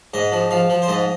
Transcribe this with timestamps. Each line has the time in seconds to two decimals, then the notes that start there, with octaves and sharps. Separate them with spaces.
0.14 G#2 D#5
0.32 F3
0.51 F3 F5
0.70 F3
0.82 C5
0.88 G#2 D#5